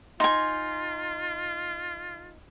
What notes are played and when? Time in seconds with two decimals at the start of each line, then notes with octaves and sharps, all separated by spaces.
0.20 D#4 F4 G#5 C6